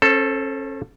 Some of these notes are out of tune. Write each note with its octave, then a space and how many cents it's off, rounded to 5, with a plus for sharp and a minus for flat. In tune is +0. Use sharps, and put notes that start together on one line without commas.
C#4 -35 A4 +0 C5 +0